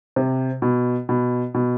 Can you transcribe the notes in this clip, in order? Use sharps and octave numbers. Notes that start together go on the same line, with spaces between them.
C3
B2
B2
B2